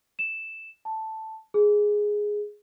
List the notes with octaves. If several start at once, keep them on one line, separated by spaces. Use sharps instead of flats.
E7
A5
G#4